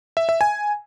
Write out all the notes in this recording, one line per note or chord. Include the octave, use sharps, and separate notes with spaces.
E5
E5
G#5